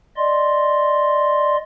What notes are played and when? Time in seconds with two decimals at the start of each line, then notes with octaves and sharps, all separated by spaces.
0.17 D5 D#5 C6